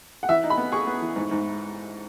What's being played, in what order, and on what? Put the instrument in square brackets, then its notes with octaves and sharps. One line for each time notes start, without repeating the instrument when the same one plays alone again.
[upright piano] F#5
[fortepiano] E3 [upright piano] E5
[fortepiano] D#4
[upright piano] B5
[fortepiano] B3
[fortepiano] G#4 [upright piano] C#6
[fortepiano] B3
E3
G#2
G#2